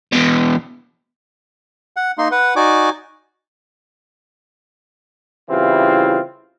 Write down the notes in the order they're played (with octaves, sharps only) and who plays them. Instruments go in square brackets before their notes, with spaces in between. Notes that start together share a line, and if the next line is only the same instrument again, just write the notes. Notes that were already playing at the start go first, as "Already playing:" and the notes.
[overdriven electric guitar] E2 B2
[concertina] F#5
A#3 D#4 C6
B4 F#5
D#4 F#4 D5 G#5 D6
[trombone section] C#3 E3 G3 C4 E4 F4